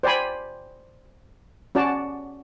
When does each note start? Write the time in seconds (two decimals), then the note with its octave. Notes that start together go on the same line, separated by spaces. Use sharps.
0.03 C5 D5 G5 G#5 B5
1.75 C#4 F#4 D5 A5